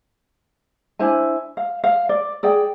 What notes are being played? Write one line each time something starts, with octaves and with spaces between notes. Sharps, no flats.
D4 E4 C5 G#5
F5
F5
D5
G#4 D5 G5